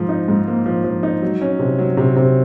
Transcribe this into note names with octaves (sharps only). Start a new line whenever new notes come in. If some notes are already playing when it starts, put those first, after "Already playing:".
Already playing: G#2 F3
D#4
G#2
A#3
F3
F3
D#4
F#3
C#4
C3
F#3
C3
C3